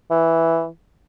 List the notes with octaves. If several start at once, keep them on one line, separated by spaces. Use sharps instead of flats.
E3